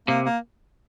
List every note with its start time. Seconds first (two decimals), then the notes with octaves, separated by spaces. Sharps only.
0.08 C3 A#3
0.26 A#3